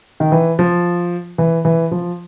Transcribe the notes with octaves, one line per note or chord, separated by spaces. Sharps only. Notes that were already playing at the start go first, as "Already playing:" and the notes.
D#3
E3
F3
E3
E3
F3